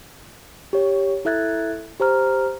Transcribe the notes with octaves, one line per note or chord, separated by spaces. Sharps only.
G4 C#5
E4 A4 E5 F#6 G#6 A6
G4 C5 A#5 F6